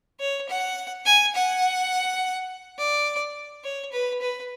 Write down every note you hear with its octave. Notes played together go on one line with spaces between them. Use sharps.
C#5
F#5
G#5
F#5
D5
C#5
B4
B4